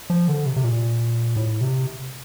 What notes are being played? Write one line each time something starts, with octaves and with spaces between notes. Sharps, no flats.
F3
D3
C3
C3
A#2
A2
C3